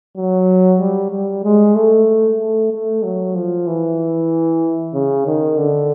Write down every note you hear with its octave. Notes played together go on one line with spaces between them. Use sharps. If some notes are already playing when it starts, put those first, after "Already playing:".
F#3
G3
G3
G#3
A3
A3
A3
F#3
F3
E3
C#3
D#3
D3